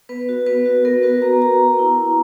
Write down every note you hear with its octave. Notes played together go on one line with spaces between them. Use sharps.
B3 B4
F#4
B3 B4
F#4
B3 A#4
F#4 B4
B3 A#5
F#4 A#5
B3
E4
B3